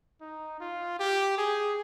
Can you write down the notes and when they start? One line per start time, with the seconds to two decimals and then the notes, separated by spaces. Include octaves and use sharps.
0.21 D#4
0.60 F4
0.99 G4
1.38 G#4